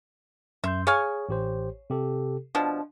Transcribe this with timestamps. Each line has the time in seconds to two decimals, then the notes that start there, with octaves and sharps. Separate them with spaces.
0.64 F#2 E5 C6 G6
0.87 G#4 C#5 F5 G#5
1.29 A1 G4 C5
1.90 C3 G4 A4
2.55 B2 F3 D4